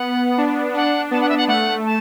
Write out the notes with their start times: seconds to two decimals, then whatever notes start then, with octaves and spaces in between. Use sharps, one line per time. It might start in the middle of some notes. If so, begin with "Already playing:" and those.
Already playing: B3 F#5
0.38 D4
0.74 D4 F#5
1.11 B3 A5
1.20 F#5
1.28 E5
1.37 F#5
1.48 A3 F#5
1.85 A5